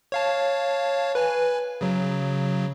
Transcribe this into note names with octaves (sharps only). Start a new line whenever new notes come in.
C#5 F5 A5
B4 G#5
C#3 F#3